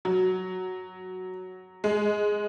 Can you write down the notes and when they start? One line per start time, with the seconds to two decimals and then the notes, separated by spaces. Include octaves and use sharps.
0.05 F#3
1.84 G#3